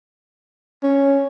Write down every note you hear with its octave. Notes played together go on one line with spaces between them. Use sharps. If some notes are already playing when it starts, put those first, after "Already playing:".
C#4